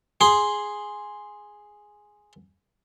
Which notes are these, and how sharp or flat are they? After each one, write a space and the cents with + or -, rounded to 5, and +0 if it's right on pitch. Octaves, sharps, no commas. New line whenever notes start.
G#4 +0 C6 +0